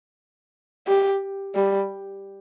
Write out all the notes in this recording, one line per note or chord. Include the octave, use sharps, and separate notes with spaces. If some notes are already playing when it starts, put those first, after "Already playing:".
G4
G3